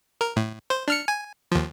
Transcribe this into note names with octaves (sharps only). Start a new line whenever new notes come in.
A#4
A2
C5
D4 F6 C#7
G#5
D#2 F3